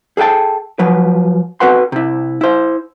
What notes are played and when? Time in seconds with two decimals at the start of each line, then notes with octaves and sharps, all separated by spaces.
0.17 G#4 A4 E5 G5 A5
0.79 F3 F#3 B4
1.60 C4 F#4 A4 B4 F#5 C6
1.92 C3 E4
2.41 E4 C5